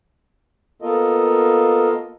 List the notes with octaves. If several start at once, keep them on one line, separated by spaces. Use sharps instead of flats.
A#3 B3 F4 A4 A#4 D#5